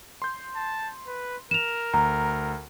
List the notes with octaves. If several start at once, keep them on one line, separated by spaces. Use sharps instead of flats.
C6 G6
A5
B4
A#4 E7 F7
D2 A#5